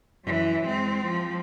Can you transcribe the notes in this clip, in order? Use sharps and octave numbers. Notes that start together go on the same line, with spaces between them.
F#2 E3
G#3 C4
F3